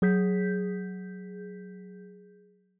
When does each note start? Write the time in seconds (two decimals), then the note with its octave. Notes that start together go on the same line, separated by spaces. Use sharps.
0.02 F#3 G#4 G6 B6